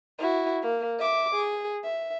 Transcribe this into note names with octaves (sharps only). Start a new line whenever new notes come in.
E4 F#4
A#3
E5 D6
G#4
E5